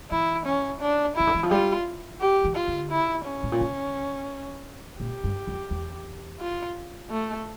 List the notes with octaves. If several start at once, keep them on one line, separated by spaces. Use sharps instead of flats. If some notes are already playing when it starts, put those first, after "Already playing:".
E3 E4
C#4
D4
C#3 E4
D3
E3
F3
G3 F4
G4
E3
F4
D3
E4
C#4
A2
A#2
C#3
A#2 G4
G2
F2
E2
F4
A3